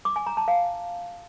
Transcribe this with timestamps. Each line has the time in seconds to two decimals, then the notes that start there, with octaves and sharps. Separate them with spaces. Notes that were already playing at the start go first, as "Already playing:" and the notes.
0.05 D6
0.16 G#5
0.26 A#5
0.37 A5
0.48 F5